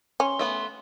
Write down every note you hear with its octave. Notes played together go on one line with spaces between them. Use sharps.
C#4 C6
A3 B3 F#5